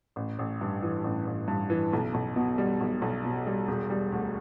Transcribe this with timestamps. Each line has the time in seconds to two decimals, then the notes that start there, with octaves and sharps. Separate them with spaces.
0.16 A1
0.39 A1
0.61 G2
0.83 E3
1.04 A1
1.27 A1
1.48 G2
1.70 E3
1.93 B1
2.14 B1
2.36 B2
2.58 G3
2.81 B1
3.02 B1
3.25 B2
3.47 G3
3.68 E1
3.90 G3
4.12 D2